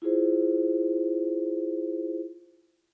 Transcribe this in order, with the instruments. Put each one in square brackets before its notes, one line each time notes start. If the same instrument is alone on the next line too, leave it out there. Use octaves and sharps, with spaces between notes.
[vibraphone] E4 F4 G#4 C5